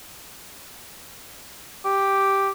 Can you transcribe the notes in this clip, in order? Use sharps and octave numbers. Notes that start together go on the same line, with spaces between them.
G4